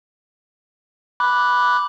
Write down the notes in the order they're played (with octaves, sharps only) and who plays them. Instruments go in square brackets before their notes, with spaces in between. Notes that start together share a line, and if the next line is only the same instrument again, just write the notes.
[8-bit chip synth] B5 D6 F#6